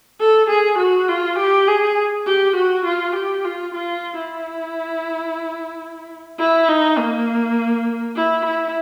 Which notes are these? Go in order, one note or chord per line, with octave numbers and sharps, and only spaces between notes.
A4
G#4
F#4
F4
G4
G#4
G4
F#4
F4
G4
F4
F4
E4
E4
D#4
A#3
E4
E4